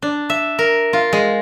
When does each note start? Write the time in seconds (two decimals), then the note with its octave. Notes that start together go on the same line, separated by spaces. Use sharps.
0.02 D4
0.30 E5
0.59 A#4
0.93 F4
1.13 G#3